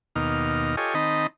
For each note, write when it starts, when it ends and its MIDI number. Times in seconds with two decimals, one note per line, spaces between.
0.16 0.76 39
0.16 0.76 47
0.16 0.76 58
0.16 0.76 63
0.16 0.76 89
0.77 0.94 65
0.77 0.94 67
0.77 0.94 69
0.77 0.94 73
0.77 0.94 75
0.77 0.94 80
0.94 1.27 51
0.94 1.27 60
0.94 1.27 63
0.94 1.27 75
0.94 1.27 81
0.94 1.27 83